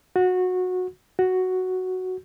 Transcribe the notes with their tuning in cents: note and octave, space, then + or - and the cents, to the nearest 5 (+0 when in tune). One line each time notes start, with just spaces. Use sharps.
F#4 -20
F#4 +0